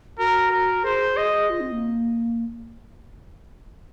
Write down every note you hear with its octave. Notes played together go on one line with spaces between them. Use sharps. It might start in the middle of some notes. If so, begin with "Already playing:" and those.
F#4 A#4
A#4
G#4 C5
D#5
F4
C4
A#3